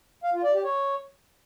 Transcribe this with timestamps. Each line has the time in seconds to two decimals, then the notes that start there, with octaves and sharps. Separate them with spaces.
0.24 F5
0.34 F4
0.44 D5
0.54 G4
0.64 C#5